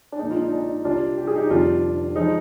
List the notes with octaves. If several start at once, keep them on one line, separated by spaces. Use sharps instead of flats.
D4
A#1 A#2 G#3 D#4
D4 F4
D#4
D4
D#4
C2 C3 G3 D4 F4
G4
G#4
D#4 G4
F1 F2 D3 G3 D4 F4
F3 G#3 D#4